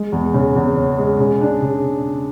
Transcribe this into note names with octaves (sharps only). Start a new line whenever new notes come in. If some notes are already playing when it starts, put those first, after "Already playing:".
Already playing: G#3
E2
C#3
E2
C#4
G#3
C#3
D4
C#3